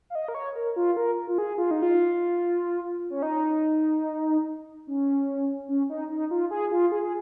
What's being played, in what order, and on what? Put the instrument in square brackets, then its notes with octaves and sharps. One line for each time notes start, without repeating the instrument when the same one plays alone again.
[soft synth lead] F5
D#5
A#4
C#5
A#4
F4
A#4
F4
G#4
F4
D#4
F4
C#4
D#4
C#4
C#4
D#4
D#4
F4
G#4
F4
G#4
G#4